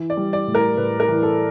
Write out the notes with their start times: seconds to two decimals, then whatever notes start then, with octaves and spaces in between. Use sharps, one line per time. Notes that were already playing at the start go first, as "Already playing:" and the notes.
Already playing: E3
0.10 D5
0.17 G3
0.33 D5
0.47 A2
0.55 A#4
0.77 A2 B4
1.00 A#4
1.08 E3
1.23 A4